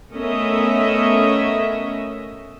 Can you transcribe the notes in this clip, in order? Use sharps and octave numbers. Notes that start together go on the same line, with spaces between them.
A3 B3 C#4 A#4 D#5 E5